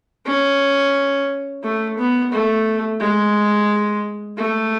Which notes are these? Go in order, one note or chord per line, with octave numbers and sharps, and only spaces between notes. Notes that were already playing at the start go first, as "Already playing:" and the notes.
C#4
A3
B3
A3
G#3
A3